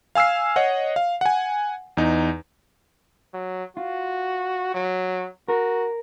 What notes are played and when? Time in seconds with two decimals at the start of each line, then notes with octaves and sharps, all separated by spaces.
0.15 F5 G#5 E6 F6 C7
0.56 C#5 D#5 F#5
0.96 F5
1.21 F#5 G#5
1.97 E2 D#4
3.34 F#3
3.77 F4 F#4
4.74 F#3
5.48 F#4 A#4